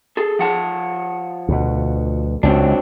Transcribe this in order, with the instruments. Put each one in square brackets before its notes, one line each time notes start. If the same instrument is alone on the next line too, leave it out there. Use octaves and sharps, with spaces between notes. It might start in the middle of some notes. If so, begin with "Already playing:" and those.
[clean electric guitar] G#4 A4
F3 F#5 A5
[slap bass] D2 B2
[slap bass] C#2 [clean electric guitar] F#3 C4 D4